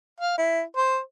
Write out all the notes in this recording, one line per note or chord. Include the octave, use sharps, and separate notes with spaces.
F5
E4
C5